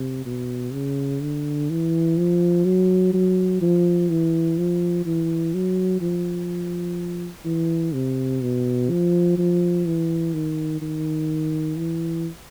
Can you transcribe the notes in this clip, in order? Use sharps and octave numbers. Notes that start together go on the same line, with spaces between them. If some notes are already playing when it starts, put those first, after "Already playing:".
Already playing: C3
B2
C#3
D3
E3
F3
F#3
F#3
F3
E3
F3
E3
F#3
F3
E3
C3
B2
F3
F3
E3
D#3
D#3
E3